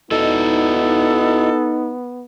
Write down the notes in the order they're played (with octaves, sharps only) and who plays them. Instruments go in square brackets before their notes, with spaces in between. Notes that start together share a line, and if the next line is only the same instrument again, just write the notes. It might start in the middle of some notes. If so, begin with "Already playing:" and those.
[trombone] B3 [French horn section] D#4 [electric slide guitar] E4 F#4 D#5 [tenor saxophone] A4